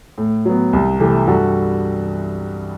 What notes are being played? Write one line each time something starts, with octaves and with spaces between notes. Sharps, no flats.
A2
F#3 B3
C2
C3 E3 A3
G2 F#4 A4